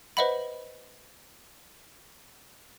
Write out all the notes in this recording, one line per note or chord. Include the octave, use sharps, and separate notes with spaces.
B4 C5 D#5 E5 F#5 B5